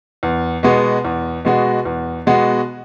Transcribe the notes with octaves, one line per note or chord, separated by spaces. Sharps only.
E2
B2 G#3 B3 F#4
E2
B2 G#3 B3 F#4
E2
B2 G#3 B3 F#4